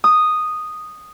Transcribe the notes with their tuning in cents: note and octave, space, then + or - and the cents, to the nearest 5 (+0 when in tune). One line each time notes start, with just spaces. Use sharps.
D#6 -5